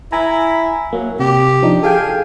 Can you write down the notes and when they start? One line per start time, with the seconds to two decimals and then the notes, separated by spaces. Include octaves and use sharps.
0.12 E4 G#5 A#5
0.93 F#3 A#3
1.19 C3 G4
1.63 F3 D4 D#4
1.83 G#4 A4 F5 G5